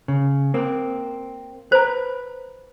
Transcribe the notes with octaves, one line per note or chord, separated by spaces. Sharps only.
C#3
A#3 C4
B4 C5 A#5